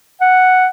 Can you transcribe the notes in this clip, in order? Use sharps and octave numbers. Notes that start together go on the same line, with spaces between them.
F#5